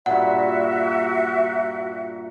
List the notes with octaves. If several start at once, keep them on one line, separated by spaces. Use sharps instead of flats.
G2 A#2 F#4 E5 F#5